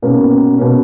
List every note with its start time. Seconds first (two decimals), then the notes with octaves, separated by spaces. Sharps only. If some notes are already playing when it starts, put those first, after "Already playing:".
0.02 B2 A#3 C#4
0.58 B2 A#3 C#4